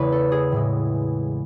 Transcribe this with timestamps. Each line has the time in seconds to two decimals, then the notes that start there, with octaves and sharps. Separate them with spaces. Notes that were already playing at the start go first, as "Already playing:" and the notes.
Already playing: E2 C#3 E3 A3 B4 C#5
0.12 A4
0.32 G#4
0.52 A2 E3 G#3